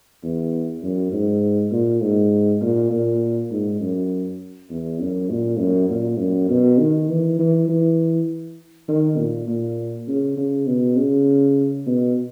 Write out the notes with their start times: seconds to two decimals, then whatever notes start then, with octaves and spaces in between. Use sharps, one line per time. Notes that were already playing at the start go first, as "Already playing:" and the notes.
0.23 E2
0.82 F#2
1.13 G#2
1.71 A#2
2.02 G#2
2.61 A#2
2.91 A#2
3.51 G#2
3.80 F#2
4.70 E2
5.00 F#2
5.30 A#2
5.59 F#2
5.90 A#2
6.19 F#2
6.49 B2
6.79 D#3
7.09 E3
7.39 E3
7.69 E3
8.88 D#3
9.18 A#2
9.48 A#2
10.07 C#3
10.37 C#3
10.67 B2
10.97 C#3
11.86 B2